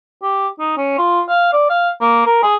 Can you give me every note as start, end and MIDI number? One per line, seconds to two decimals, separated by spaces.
0.23 0.48 67
0.60 0.77 63
0.77 0.96 61
0.98 1.21 65
1.29 1.49 77
1.53 1.67 74
1.70 1.90 77
2.01 2.25 58
2.26 2.43 70
2.43 2.56 68